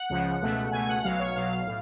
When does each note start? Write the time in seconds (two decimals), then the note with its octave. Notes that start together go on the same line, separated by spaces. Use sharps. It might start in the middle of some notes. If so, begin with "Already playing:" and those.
Already playing: F#5
0.10 C#2 C#3 F3
0.42 C#2 B2 A3
0.72 C#2 B2 A3 G#5
0.89 F#5
1.04 B1 B2 F#3 F5
1.20 C#5
1.35 B1 B2 F#3 F5
1.66 A2